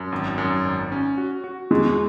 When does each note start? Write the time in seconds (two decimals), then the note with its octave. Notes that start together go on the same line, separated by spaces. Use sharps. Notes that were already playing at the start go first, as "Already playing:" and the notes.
Already playing: F#2
0.12 G#1
0.38 F#2
0.65 G#1
0.92 C#4
1.18 F#4
1.44 F#4
1.71 E2 G#3